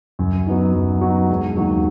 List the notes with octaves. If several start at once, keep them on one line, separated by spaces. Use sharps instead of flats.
F#2
F#3 B3 D#4
F#2
F#3 B3 D#4
E1
D#2 D#3 F#3